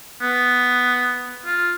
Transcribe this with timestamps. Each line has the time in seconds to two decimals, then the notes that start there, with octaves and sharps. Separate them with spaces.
0.21 B3
1.45 F4